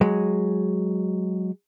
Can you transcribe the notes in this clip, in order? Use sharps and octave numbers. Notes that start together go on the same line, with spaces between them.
F#3 G#3